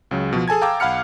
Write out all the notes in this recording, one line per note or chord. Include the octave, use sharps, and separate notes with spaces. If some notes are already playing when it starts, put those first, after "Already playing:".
C#2 C#3 F#3
B2 F3
G#4 A4 G#5 A5 G#6
F5 G5 A5 A#5 D6 E6
B1 F5 F#5 B5 F6 C#7